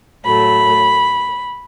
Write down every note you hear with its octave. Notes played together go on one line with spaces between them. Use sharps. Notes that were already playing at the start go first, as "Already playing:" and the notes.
A2 F#3 A3 B5